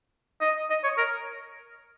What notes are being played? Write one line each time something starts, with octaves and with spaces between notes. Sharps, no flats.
D#5
D#5
C#5
A#4